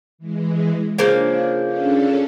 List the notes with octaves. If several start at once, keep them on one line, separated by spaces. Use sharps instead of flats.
E3 G#3
C#3 F3 A#3 D4
C#4 D4 A4